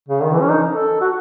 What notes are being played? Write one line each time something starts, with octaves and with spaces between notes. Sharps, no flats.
C#3
D#3
E3
C#4
D#4
A4
F#4